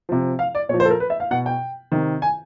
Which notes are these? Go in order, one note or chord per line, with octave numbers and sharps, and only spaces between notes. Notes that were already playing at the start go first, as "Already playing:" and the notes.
C3 F3
F5
D5
A#2 F3 C#5
C5
A4
A#4
B4
E5
F5
B2 F#5
G5
C3 D#3
G#5